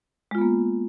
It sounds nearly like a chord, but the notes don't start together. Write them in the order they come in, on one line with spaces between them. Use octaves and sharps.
G#3 F4 B3 A#3